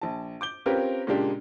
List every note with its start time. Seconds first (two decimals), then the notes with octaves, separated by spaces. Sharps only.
0.01 A#1 A5
0.41 D6 G6 G7
0.66 C4 C#4 F4 G4 A#4 B4
1.07 A#2 C#3 G#3 A#3 D4 G4